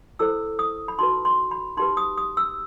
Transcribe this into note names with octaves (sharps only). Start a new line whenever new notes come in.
E4 A4 C5 E6
D#6
B5
D#4 F#4 B4 C6
C6
B5
D#4 G4 B4 C6
D#6
D#6
E6